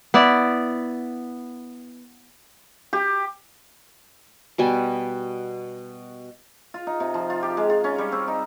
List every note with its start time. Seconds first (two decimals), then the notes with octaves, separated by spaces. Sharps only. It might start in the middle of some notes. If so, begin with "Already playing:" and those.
0.14 B3 E4 D5
2.93 G4
4.58 B2 G3 G#5 A5
6.74 F4
6.87 D#4
7.00 C3
7.14 F3
7.30 F4
7.43 G4
7.57 G#3
7.70 F4
7.84 C#4
7.98 G3
8.12 C4
8.28 D#4